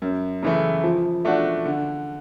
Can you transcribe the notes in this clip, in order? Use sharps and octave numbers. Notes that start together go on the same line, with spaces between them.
F#2
C#3 E3 A3
F3
A3 D4 F#4
D3